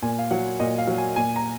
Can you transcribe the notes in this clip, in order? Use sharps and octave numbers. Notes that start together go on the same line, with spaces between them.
A#2 G#5
F5
F#3 F#5
A#2 D#5
F5
F#3
G#5
A#2 G#5
A#5